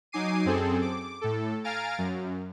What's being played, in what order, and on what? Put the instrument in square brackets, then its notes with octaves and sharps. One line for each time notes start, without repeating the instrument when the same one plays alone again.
[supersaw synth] F#3 D#4 G#5 D6 C7 D#7
F#2 C4 G#4 A4
D6
A2 A4
F5 G#5 A#5 F6 A6 D7
F#2